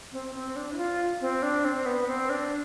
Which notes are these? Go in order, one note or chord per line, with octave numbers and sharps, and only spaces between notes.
C4
C4
D4
E4
F4
C4
D4
C4
B3
C4
D4